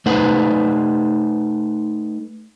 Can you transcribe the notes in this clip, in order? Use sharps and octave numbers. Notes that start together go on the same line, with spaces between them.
A3 D#4 B4 C5 F#5